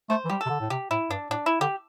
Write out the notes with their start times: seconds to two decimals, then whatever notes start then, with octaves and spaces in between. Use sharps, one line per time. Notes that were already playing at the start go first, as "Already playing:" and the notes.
0.10 A3 C5
0.25 E3
0.30 G3 G4
0.41 A4
0.46 C3
0.50 D3
0.60 A2
0.70 C3 G4
0.91 A2 E4
1.10 G2 D4
1.31 A2 D4
1.46 E4
1.61 D3 G4